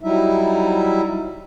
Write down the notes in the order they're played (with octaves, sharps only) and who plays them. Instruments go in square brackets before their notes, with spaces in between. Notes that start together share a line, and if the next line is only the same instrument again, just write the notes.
[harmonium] F#3 G3 D#4 E4 E5